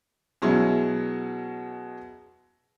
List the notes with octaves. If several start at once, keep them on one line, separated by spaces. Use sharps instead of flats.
B2 F#3 G#3 C#4 E4